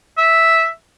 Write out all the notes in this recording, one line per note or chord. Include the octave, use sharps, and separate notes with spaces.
E5